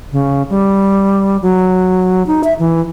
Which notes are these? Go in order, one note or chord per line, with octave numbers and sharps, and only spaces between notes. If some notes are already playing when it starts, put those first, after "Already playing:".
C#3
G3
F#3
D#4
E5
E3